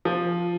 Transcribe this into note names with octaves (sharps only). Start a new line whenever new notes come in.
F3